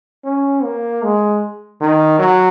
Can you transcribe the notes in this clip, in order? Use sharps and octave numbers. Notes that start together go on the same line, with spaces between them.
C#4
A#3
G#3
D#3
F#3